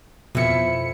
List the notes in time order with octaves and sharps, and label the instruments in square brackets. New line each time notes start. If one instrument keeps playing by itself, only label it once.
[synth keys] F2 F3 C#7 [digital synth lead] B2 [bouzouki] E4 E5